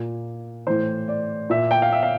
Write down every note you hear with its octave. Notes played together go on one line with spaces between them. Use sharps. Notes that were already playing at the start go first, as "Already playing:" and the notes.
Already playing: A#2
A2 E3 C5
D5
A#2 E5
G5
F5
E5
F5